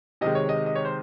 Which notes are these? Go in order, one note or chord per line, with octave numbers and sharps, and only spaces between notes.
C3 D#3 G#3 D#5
C#5
D#5
D#5
C#5
C5